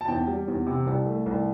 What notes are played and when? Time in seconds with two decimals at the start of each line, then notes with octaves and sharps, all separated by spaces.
0.01 A5
0.08 E2 G5
0.27 G3
0.48 E2
0.66 C3
0.86 C2
1.06 A3
1.26 C2